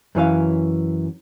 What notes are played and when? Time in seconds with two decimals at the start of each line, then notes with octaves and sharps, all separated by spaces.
0.15 F#2 E3 C#4 F5